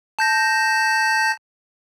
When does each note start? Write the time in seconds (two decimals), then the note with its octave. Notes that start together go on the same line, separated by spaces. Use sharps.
0.19 A5 G6 A#6